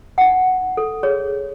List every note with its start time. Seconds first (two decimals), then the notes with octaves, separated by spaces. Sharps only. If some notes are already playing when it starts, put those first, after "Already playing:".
0.18 D#4 F#5
0.77 A4
1.03 G#4 C#5